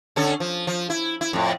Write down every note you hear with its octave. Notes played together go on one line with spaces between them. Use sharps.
D3 C#4 A4
F3
F3
E4
E4
F2 A2